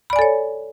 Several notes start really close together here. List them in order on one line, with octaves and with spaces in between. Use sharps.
B5 D5 G#5 A4 C#5